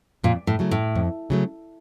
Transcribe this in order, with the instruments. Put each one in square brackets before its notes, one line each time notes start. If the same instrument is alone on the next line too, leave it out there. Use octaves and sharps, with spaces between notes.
[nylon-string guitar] F2 [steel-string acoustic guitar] A#2
[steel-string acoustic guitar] A2
[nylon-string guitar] C#3 F#3 A3
[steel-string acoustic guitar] A2
[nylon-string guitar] F2
C#3 F#3 A3